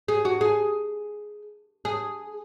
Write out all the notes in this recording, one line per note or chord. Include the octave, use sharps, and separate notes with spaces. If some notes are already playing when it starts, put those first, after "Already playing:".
G#4
F#4
G#4
G#4